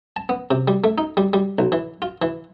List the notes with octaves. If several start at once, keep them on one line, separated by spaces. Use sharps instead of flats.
A5
B3
C3
G3
A3
D#4
G3
G3
B1
E3
F4
E3